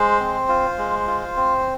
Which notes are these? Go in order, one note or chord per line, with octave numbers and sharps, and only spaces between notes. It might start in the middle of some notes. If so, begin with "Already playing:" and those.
Already playing: G#3 C5
C4
F4
G#3
F4
C4